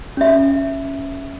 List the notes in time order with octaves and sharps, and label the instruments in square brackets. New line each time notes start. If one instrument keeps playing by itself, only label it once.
[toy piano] C#4 E5